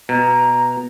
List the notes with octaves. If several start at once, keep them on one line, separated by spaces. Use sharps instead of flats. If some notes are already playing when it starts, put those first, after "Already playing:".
B2 A#5